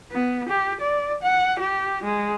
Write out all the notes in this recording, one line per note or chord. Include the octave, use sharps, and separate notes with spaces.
B3
G4
D5
F#5
G4
G#3